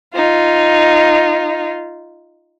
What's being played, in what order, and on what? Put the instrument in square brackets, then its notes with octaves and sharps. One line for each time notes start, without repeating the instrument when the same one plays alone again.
[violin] D#4 F4